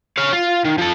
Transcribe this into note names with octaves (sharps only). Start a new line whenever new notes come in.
C#5 F5
F4
D#3
F3 A4